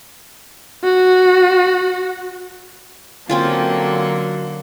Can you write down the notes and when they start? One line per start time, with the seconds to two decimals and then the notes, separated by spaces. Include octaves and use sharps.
0.84 F#4
3.29 D3 F#3 A#3 C4 C#4 F4